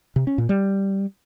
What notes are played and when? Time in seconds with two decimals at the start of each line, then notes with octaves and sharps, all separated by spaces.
0.16 C3
0.27 C#4
0.38 A#2
0.49 G3